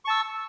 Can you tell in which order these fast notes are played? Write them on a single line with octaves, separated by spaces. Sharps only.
C#6 A5 E6